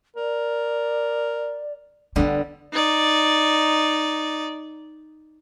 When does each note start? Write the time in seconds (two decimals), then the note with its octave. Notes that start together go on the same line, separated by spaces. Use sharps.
0.16 A#4 D5
2.16 D3 G3 B3 C#4 D4
2.72 D#4 D5